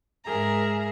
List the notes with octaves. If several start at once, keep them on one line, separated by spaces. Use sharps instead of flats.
G#2 G#4 A#4 E5 A#5